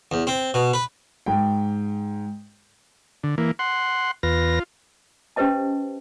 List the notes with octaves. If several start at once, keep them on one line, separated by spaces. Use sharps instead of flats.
E2
C4
B2
B4
G#2 G5
D3
E3 A#3
F#5 C6
E2 F4 B4 A#6
C#4 G4 B4 C5 D#5 A5